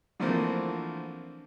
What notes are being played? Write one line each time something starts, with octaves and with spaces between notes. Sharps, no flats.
D3 E3 F3 A3 A#3 C4